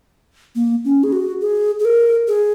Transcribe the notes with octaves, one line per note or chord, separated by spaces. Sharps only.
A#3
C#4
G#4
F#4
G#4
G#4
A#4
G#4